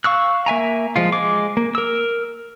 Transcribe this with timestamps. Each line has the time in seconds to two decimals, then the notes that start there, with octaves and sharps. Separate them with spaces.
0.04 F5 C#6 E6 F#6
0.46 A#3 E5 G#5 A#5
0.96 F3 G#3 F4
1.12 G#3 D6
1.57 A#3
1.75 A#4 E6